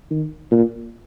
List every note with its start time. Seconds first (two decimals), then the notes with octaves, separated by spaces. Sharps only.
0.10 D#3
0.51 A#2